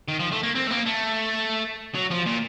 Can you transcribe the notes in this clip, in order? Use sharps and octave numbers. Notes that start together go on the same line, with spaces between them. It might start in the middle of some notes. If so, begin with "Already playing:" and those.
D#3
F3
A3
A#3
C4
A3
A#3
A3
F#3
F3
A#2